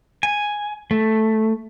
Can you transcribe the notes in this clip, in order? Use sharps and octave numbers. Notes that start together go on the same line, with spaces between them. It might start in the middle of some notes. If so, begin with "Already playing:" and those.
G#5
A3